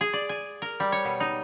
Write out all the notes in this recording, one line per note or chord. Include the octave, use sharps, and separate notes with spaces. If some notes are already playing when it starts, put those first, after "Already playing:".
G#4
D5
G#5
A#4
G3
C#5
B2
D#4